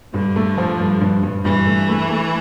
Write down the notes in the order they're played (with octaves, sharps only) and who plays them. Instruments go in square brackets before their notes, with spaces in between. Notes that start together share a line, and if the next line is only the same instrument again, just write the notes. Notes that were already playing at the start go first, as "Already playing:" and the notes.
[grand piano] G2 [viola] D3
[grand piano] A3
F3
G2
G2
G2
[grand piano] G2 [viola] E3
[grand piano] A3
A3
A3